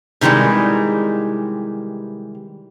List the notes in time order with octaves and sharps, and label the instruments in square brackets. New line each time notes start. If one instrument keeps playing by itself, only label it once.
[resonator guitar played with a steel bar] C3 D#3 E3 G3 G#3